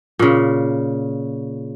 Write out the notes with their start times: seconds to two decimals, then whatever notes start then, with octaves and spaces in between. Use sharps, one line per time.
0.19 A#2 C#3